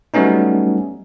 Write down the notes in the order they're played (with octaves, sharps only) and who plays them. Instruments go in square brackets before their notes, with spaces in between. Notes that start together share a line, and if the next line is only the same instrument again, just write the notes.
[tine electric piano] F#3 G3 A3 B3 C#4 D#4